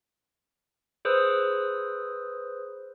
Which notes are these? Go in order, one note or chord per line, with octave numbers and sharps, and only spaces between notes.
G#4 B4 C5 D#6 E6